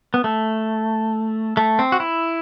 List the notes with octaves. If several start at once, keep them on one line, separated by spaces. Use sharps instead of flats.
B3
A3
A3
C4
F#4
E4